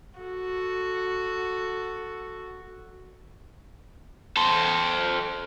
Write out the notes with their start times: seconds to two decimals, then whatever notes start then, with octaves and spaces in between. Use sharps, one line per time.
0.19 F#4 A4
4.37 A4 C5